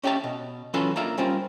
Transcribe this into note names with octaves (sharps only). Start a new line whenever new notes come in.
C#4 G4 C#5 E5 A5
B2
E3 F#3 C#4 F4 A4 B4
A#3 D4 F4 A#4 E5 F5
G3 C#4 F4 A#4 C5